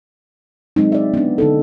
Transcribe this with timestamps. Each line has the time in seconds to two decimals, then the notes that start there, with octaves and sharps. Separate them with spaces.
0.76 F#3 G#3 C4 D#4
0.92 D5 E5
1.14 B3 D4
1.38 D3 D#4 A4